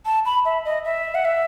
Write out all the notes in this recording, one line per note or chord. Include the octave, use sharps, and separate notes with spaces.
A5
B5
E5
D#5
E5
F#5
E5